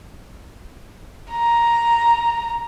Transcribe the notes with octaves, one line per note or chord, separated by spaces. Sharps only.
A#5